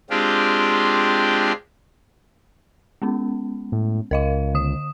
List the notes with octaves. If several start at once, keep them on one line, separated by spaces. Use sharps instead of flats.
G#3 C4 D4 F4 G4
G#3 B3 C#4
A2
C#2 A#4 D#5 F5
D3 D#6 E7